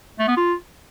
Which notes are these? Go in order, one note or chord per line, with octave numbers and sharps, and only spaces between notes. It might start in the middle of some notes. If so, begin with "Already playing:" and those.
A3
B3
F4